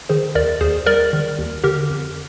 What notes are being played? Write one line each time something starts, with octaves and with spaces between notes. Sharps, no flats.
D#3 G#4 C5
D#2 A#4 D5
D#2 G#4 C5
G3 A#4 D5
D#3
D#2
D3 G4 A#4
F2